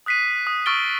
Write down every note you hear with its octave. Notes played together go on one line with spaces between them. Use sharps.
D#6 F#6 B6 C7 D#7
D#6
C#6 E6 F6 A6 D7 G7